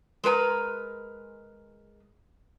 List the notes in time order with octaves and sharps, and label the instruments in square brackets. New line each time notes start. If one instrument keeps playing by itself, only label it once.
[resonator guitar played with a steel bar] G#3 A#4 B4 A#5